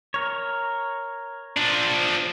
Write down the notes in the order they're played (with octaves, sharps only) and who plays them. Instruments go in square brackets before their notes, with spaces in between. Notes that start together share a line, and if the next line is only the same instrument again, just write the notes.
[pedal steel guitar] A#4 C#5
[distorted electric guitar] F3 D4